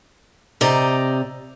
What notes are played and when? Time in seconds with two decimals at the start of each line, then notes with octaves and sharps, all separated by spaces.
0.61 C3 G4 D5 D#5 A#5